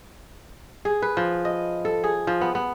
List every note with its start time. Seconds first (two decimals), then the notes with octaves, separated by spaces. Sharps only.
0.85 G#4
1.02 B4
1.17 F3
1.45 D#5
1.85 A4
2.04 G#4
2.27 F3
2.41 B3
2.55 B3